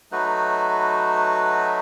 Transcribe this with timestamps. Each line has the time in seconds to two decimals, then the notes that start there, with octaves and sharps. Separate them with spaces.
0.12 F#3 A3 D#4 F#4 B4